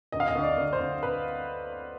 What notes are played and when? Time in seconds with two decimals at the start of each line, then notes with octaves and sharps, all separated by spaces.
0.12 D2 D#5
0.20 F5
0.28 D#5
0.35 D2
0.43 D5
0.58 D2
0.73 C5
0.80 D2
1.03 B4